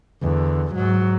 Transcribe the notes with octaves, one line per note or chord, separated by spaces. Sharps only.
E2 D3
G#2 F#3